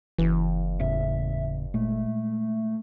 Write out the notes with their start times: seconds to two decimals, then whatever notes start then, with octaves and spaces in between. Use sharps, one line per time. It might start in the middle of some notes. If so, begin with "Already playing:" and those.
0.18 F#1 E3
0.80 E2 A2 C#3 E5
1.74 A#2 G#3 A3